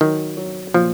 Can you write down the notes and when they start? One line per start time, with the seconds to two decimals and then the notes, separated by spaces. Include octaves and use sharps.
0.01 D#3 F#3
0.37 F#3
0.74 A#2 F3